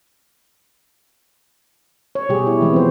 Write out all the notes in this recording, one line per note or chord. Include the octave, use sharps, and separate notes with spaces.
C#5
B2 G3 G4 G#4
E4
E3 G#3 B3 C4
F3 C5